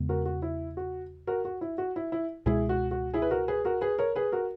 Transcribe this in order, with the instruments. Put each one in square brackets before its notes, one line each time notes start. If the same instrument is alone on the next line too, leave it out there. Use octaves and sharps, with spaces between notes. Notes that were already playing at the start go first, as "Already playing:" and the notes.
Already playing: [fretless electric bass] E2 C#3 G#3 B3
[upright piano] F#4 A#4
F#4
E4
F#4
F#4 A#4
F#4
E4
F#4
E4
E4
[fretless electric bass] C#2 B2 G#3 [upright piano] E4 G#4
[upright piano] F#4
F#4
E4 G#4
B4
F#4 A#4
G#4 B4
F#4 A#4
G#4 B4
A#4 C#5
G#4 B4
F#4 A#4